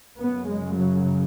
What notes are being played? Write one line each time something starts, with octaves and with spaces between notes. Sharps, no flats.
F#2 C#3 B3
G#3
F#3